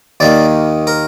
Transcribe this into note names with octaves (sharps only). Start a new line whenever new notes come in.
D#2 D#3 A#3 D5
A#4